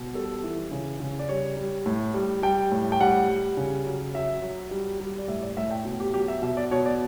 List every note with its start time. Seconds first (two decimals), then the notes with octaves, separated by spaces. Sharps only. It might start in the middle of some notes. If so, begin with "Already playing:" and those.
Already playing: B2
0.14 G3 A4
0.43 E3
0.71 C#3
1.00 C#3
1.19 D5
1.29 G3 C#5
1.57 G3
1.86 A2
2.14 G3
2.42 G3 G5
2.72 A2
2.92 G5
3.01 G3 F#5
3.28 G3
3.57 C#3
3.86 F#3
4.14 F#3 E5
4.42 F#3
4.71 G3
5.00 G3
5.18 D5
5.28 A2 E5
5.43 D5
5.57 A2 E5
5.71 G5
5.85 B2
6.00 G4
6.14 F#3 G4
6.28 E5
6.42 B2 E5
6.57 D5
6.71 B2 C#5
6.86 D5